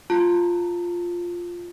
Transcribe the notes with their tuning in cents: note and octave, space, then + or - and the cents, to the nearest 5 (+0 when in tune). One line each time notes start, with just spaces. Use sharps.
F4 +0 A5 +30